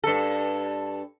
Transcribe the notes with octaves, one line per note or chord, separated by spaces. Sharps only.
G2 A4